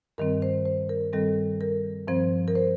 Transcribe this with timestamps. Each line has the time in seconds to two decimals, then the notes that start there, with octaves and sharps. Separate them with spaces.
0.18 G2 D#3 G3 C4 A#4
0.42 C5
0.65 C5
0.89 A#4
1.13 G2 D#3 G3 C4 A4
1.61 A#4
2.08 G2 F3 C4 C5
2.48 A#4
2.55 C5